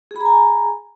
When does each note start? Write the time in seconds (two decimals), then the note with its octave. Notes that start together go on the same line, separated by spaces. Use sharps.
0.11 G#4
0.16 B5
0.21 A#5
0.26 G#5